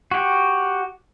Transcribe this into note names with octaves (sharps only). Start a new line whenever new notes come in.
F#4 G4